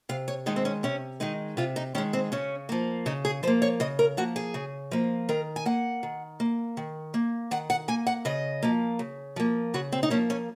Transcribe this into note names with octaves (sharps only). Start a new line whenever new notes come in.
C3 F5
C#5
D#3 G#3 D#4
C4
C#4
C3 C#4
D#3 G#3 D#4
C3 F4
D#4
D#3 G#3 C#4
C4
C#3 C#4
F3 A#3
C#3 D#4
G#4
F3 A#3 C5
C#5
C#3 D#5
A#4
F3 A#3 F#4
G#4
C#3
F3 A#3
D#3 A#4
G#5
A#3 F#5
D#3
A#3
D#3
A#3
D#3 F#5
F#5
A#3 G#5
F#5
C#3 D#5
F3 A#3
C#3
F3 A#3
C#3 F#4
C4
D#4
F3 A#3 C#4
C#4